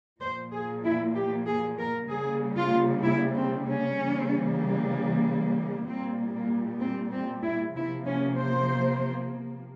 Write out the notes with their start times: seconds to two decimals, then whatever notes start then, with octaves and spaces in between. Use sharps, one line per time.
0.20 A#2 F3 A#3 C5
0.51 G#4
0.84 E4
1.15 G4
1.46 G#4
1.78 A#4
2.09 C#3 G3 A#3 G#4
2.56 F4
3.03 E4
3.35 C4
3.66 C#4
3.98 C#3 E3 G3 A#3
5.86 A#2 G3 A#3 C4
6.33 A#3
6.81 C4
7.12 C4
7.43 E4
7.74 C3 F3 A#3 E4
8.07 C#4
8.38 C5